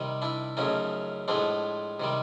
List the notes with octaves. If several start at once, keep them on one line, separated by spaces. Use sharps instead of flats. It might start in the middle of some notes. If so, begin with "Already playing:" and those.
Already playing: C3 D#3 G3
D4 E4
F#2 C#3 F3 A3 C#4 D#4
A2 F3 G#3 C4 D4
C3 D#3 G3